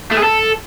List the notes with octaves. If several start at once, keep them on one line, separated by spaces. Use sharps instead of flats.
A3
G#4
A4